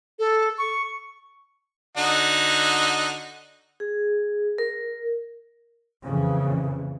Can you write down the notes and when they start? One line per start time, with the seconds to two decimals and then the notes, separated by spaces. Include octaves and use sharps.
0.19 A4
0.58 C#6
1.97 D3 D#4 F#4
3.80 G#4
4.58 A#4
6.05 F2 A#2 C#3 E3